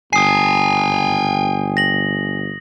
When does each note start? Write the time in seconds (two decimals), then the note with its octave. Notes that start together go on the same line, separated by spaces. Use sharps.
0.13 G1 G5 G#5 D#6 C7
1.77 A#6 F#7